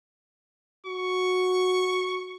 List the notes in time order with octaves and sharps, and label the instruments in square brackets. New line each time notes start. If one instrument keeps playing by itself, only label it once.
[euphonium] F#4 [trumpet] C#6